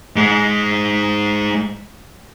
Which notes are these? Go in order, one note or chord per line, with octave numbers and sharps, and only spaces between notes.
G#2 G#3